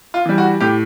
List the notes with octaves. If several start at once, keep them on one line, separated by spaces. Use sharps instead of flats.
F4
E3 G3
F#4
A2 G4